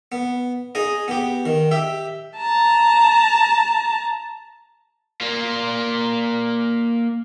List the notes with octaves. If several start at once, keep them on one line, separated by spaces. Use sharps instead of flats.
B3
D#4 G#4 D#5
B3 G4
D#3
G4 E5
A5 A#5
A#3 F4